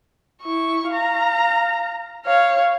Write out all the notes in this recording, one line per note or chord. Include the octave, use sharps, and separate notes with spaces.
E4 C#6
F5 A#5
C#5 F5